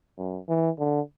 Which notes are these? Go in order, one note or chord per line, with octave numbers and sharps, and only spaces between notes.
F#2
E3
D3